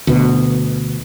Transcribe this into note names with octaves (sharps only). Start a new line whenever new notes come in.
D2 B2